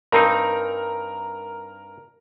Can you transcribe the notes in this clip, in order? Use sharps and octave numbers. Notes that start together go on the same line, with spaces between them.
G2 C4 D#4 A#4